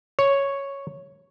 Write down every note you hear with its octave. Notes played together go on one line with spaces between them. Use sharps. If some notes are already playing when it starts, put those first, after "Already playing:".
C#5